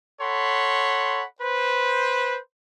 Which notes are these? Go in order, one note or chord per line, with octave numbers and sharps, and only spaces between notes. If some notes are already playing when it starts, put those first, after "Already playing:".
A4 C#5 F#5 B5 C6
B4 C5